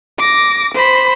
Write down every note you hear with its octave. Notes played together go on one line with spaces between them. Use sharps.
D6 A#6
C5 B5